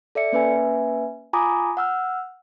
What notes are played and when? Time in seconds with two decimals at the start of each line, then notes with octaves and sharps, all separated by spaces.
0.15 A4 D5 E5 C#7
0.32 A#3 C#4 B4 E5 G#5
1.33 F4 G#5 A#5 B5 D6 D#6
1.77 F#5 E6 F6